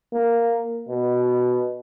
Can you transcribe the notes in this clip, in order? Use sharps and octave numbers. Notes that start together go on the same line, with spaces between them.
A#3
B2